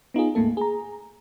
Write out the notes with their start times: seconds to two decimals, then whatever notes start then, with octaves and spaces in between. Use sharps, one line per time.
0.14 B3 D#4 F4 G#4
0.35 D2 G#2 A3 A#3 A4
0.57 G#4 A#5